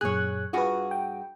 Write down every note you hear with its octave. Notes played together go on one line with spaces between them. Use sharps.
F#2 A#2 G#4 C#5 F#6
G2 F4 F#4 G#4 B4
G5